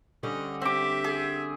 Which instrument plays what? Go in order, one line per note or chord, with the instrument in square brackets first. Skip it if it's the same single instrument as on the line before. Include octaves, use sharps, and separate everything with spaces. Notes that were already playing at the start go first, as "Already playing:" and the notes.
[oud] D3 G3 C#4 [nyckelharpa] D#5
[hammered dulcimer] C4 D6 [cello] G4 [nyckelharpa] E5
[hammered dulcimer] G#4